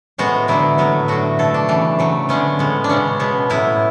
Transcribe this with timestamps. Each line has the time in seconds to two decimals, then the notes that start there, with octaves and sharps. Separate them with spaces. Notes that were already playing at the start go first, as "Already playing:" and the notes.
0.18 A2 G#3 B3 F#4
0.48 D3 F#3 B3 E4
0.78 A2 F#3 B3
1.08 D3 A3 F#4
1.39 B2 A3 A4
1.54 D4
1.69 C#3 E3 A3
1.99 C#3 F#3 A3
2.29 D3 G#3 B3 C#4
2.59 A2 G#3 B3
2.84 D4
2.89 C#3 G#3 B3 C#4
3.19 B2 G#3 B3
3.50 A2 F#3 B3 E4